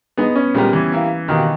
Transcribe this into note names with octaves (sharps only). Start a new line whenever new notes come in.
G#3 B3 D#4 G#4
C#4
A#2 G3 G#3 B3 G4 A#4
E3
A#3 E4 G4
B2 D#3 A#3 D#4 G4 A#4